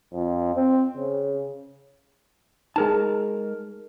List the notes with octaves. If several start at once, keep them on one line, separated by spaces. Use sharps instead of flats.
F2
C4
C#3
G#3 D#4 G#4 A#4 A5